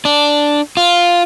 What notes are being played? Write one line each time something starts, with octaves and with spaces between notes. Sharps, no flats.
D4
F4